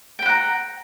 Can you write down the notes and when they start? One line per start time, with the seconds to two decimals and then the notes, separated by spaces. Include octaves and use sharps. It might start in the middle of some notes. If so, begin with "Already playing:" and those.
0.19 G5
0.22 B5
0.26 F#5
0.29 A#5